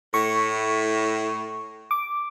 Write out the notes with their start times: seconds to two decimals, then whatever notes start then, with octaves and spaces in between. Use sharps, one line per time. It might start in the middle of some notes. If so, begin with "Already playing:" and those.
0.14 A2 C#6
1.91 D6